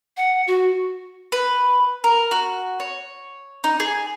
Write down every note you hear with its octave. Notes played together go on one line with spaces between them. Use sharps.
F#5
F#4
B4
A#4
F#4
C#5
D#4
G#4